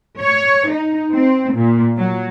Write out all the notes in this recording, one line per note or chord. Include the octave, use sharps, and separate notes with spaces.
C#5
D#4
C4
A#2
F#3